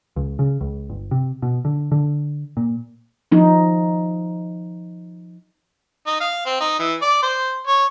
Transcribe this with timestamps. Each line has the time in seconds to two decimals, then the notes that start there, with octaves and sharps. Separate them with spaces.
0.16 C#2
0.39 C#3
0.61 C#2
0.90 G1
1.11 C3
1.42 B2
1.65 D3
1.92 D3
2.57 A#2
3.32 F3 D#4
6.06 D#4
6.20 F5
6.46 C4
6.60 D#4
6.79 E3
7.02 D5
7.22 C5
7.67 C#5